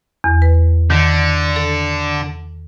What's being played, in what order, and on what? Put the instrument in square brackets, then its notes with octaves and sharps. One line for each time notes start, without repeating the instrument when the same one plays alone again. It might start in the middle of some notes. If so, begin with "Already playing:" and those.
[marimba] E2
B4
[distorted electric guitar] D3 [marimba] D#3
[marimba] A4